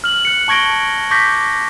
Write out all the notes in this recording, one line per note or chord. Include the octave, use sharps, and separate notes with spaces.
F6 F#7
F#6 C#7
A5 C#6 G#6 A#6 D7 G7
C#6 D6 G6 A#6 B6